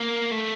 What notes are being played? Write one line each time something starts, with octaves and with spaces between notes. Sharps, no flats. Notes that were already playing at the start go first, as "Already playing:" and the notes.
Already playing: A#3
A3